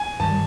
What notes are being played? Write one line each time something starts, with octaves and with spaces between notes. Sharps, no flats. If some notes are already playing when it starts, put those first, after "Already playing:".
Already playing: G#5
G2 D#3 G3 A5